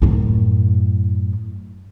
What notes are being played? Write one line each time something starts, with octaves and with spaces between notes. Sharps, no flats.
F#2 A2